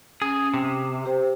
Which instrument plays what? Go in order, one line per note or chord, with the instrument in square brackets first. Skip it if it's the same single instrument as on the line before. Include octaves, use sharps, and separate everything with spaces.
[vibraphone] C#4 [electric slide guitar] G#4
[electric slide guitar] C3 [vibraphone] G5
[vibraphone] G4 C5 G5